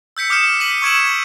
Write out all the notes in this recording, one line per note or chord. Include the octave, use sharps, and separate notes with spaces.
E6 G6 B6 C#7
D6 D#6 F6 G6 C#7 E7
B6 D#7 F#7
C#6 E6 G#6 D7 E7 F#7